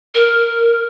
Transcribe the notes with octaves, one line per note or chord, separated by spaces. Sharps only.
A#4